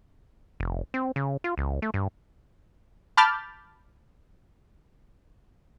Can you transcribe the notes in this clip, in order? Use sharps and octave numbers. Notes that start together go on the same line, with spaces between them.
F1
C4
C#3
F4
C#2
A3
G2
A5 B5 D6 F6 G6 A6